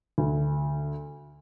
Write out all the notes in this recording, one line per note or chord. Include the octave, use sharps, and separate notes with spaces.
D2